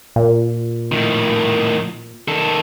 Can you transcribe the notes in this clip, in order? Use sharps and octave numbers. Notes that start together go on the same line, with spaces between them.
A#2
A2 D#3
D#3 A4